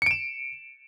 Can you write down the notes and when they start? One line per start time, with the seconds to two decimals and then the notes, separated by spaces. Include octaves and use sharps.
0.02 C#7
0.06 D7
0.11 E7